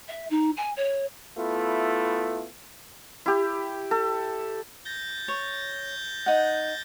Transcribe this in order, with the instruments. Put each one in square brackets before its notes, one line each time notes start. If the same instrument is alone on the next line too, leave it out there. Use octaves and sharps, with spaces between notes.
[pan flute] E5
D#4
G#5
C#5
[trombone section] A3 B3 E4 F4
[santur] E4 G4
A4
[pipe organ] G6 A6 A#6
[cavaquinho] C#5
D#4 F#5